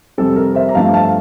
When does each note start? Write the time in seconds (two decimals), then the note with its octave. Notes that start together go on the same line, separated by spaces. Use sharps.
0.18 F2 C3 G3 C4 A4
0.36 A#4
0.55 C5 E5
0.69 A#5
0.74 G2 F3 A3 F5 A5
0.94 F5 A5